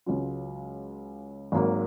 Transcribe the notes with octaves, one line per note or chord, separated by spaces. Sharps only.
C#2 C#3 F#3 C#4 F4
G#1 G#2 F#3 A#3